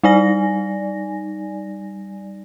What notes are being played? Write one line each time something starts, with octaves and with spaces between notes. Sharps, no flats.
G3 D#4 D5 G#5 A#6